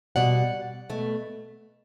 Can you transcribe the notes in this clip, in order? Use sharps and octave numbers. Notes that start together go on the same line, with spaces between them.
B2 G3 D5 F#5
B2 A3